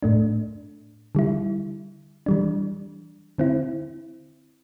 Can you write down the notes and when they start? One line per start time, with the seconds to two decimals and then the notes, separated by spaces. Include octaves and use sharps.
0.03 A2 A3 D4
1.15 D3 G3 E4
2.26 E3 G3 D4
3.38 D3 C4 E4